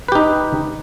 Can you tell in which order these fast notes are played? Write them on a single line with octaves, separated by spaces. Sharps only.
B4 G4 D#4